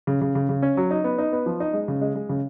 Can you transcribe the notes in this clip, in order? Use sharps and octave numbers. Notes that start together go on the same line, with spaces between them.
C#3
C#3
C#3
C#3
C#4
F#3
D#4
B3
D#4
B3
F3
D#4
G#3
C#3
G#3
G#3
C#3